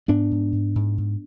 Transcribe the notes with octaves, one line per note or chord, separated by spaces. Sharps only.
G#2 B3 D4
G#2
G#2
G#2
G#2